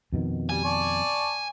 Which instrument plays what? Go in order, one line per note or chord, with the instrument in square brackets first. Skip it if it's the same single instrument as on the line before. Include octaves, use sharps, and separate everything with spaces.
[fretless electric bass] F2 B2 D#3
[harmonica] G3 [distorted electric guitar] G#5
[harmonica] D5 A5 C#6